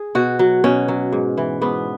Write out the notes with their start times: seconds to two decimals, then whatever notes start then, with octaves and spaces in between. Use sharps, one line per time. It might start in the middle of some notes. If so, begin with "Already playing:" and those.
Already playing: G#4
0.15 B2 F#4
0.39 F#3
0.64 B2 C#4
0.88 F#3
1.12 G#2
1.37 E3
1.61 G#2 B3